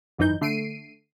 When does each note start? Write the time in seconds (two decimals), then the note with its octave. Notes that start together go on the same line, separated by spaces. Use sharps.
0.18 G#1 F#2 E3 D#4 G6
0.41 D3 A3 C7 D7 D#7